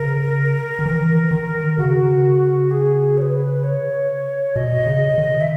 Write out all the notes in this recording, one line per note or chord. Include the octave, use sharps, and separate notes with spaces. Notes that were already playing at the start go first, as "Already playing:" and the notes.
Already playing: C#3 A#4
D#3
E3
D#3
C#3 F#4
G#4
C#5
B4
C#5
B2 D#5
C#3
D#3
E5